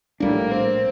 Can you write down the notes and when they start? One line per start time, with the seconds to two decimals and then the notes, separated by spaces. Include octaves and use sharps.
0.20 A#1 A2 G3 A#3 D4
0.51 C4